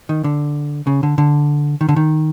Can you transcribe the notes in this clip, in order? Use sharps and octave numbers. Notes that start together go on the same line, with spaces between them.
D#3
D3
C#3
D3
D3
D#3
D3
D#3